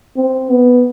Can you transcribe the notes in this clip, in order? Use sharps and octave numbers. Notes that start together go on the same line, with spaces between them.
C4
B3